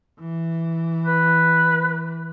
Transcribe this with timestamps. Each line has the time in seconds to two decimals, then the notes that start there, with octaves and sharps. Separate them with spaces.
0.20 E3
1.03 B4